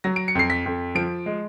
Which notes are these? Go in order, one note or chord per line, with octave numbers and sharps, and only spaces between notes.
F#3 A#6
D7
C#7
F2 C7
B6
F2
F3 D7
G#3